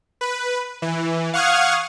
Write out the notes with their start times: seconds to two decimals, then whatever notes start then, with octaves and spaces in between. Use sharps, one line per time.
0.21 B4
0.82 E3
1.33 F5 F#5 C#6 D#6 F6 G#6